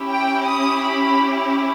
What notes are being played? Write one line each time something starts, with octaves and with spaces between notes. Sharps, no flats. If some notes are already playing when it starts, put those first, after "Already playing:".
Already playing: C#4 E4 G4
G5
D#6
B5